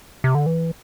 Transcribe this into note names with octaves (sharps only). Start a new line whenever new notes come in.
C3
D3
E3